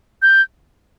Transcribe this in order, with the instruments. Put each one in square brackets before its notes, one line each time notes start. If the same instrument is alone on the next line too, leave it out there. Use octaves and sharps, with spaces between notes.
[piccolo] G6